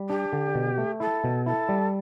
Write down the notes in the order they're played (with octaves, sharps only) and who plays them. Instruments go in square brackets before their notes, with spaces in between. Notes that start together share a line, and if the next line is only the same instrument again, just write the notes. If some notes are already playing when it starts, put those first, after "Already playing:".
Already playing: [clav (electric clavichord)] G3
[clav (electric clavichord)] D4 [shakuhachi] G4
[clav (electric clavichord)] D3
B2
A3
[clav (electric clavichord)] E4 [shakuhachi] A4
[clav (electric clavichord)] B2
[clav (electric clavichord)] E4 [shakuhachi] A4
[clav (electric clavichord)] G3